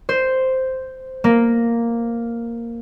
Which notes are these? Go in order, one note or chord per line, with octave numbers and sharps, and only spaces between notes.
C5
A#3